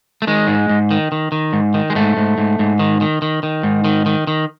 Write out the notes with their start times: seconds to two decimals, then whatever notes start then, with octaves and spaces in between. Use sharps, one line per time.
0.22 A3
0.27 D#3 G#3
0.48 G#2
0.70 G#2
0.91 D#3
1.12 D#3
1.32 D#3
1.53 G#2
1.74 D#3
1.90 G#3
1.95 G#2 A3
2.17 G#2
2.38 G#2
2.59 G#2
2.79 D#3
3.01 D#3
3.22 D#3
3.43 D#3
3.63 G#2
3.84 D#3
4.06 D#3
4.27 D#3